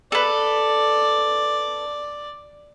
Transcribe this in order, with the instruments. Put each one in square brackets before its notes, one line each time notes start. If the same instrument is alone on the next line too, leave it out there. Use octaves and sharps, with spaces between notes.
[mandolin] A4 B4 [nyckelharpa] D5